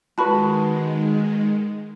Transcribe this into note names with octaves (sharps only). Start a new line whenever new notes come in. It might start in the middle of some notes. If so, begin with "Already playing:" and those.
D#3 G#3 F#4 B4 A5 B5 C#6